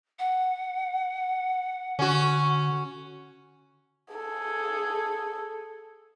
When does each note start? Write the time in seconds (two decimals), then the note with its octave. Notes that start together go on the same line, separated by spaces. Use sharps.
0.19 F#5
1.99 D3 C#4 F#4
4.14 G#4 A4